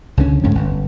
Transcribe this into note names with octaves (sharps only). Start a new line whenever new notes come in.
C#2 D3 F#3 C#4
F2 G#2 A3 C#4
G1